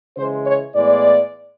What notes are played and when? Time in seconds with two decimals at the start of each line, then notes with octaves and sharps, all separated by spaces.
0.17 C#3 E3 G#3 C5
0.46 C#5
0.74 A2 E3 G#3 B3 D5